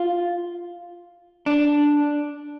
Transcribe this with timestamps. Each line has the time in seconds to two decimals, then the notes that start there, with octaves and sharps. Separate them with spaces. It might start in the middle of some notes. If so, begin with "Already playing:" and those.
Already playing: F4
1.46 D4